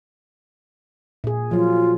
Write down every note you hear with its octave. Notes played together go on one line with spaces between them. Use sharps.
A#2 G#4
F3 F#3 F4